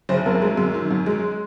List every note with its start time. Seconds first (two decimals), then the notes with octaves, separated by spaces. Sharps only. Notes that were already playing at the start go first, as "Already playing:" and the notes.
0.09 F#1 C5
0.26 F#2 A#4
0.42 G#3
0.57 F#2
0.74 D#3
0.91 F#2
1.06 G#3